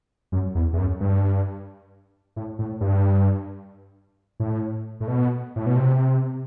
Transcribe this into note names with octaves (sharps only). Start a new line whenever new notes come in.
F#2
E2
E2
F#2
G2
A2
A2
G2
A2
A2
B2
A2
B2
C3